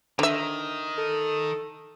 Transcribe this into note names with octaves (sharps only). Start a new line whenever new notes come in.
D3 D#3 E5
A4